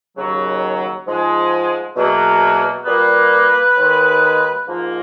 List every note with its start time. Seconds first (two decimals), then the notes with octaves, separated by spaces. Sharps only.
0.16 D#2 C#3 F#3
1.06 G#2 F3 G#3
1.95 E2 B2 F#3 A#3
2.85 A#2 G3 A#3 B4
3.76 D#2 D#3 G#3
4.66 G#2 F3 A#3